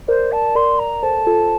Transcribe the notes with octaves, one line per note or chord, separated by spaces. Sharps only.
A#4 C5 D5
A5
A#4 D5 C6
A#5
A4 C5 A5
F4 A4